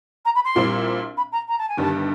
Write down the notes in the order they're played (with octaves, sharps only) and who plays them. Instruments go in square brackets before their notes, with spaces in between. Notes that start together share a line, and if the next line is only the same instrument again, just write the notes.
[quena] A#5
B5
C6
[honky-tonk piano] A#1 A#2 G3 C4 E4
[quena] B5
A#5
A#5
A5
G#5
[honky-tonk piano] G1 G2 D#3 G3 [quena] A5